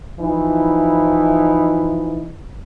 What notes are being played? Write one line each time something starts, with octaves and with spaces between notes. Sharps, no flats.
E3 F3 D#4 E4